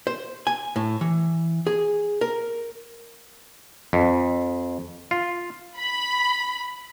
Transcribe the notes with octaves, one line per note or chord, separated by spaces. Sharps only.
C5
G#5
A2
E3
G#4
A#4
F2
F4
B5